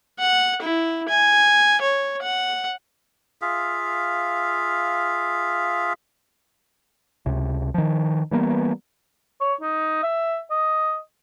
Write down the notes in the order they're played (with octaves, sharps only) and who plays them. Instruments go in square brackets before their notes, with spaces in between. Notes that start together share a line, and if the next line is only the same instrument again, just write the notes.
[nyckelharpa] F#5
E4
G#5
C#5
F#5
[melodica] F4 G#4 E5 F5
[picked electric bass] C#2 C3
D#3 F3
E3 G3 A#3 B3
[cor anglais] C#5
D#4
E5
D#5